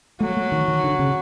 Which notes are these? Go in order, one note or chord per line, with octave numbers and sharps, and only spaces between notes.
F#3 A3
A3
D#3
D#3
D3
C#3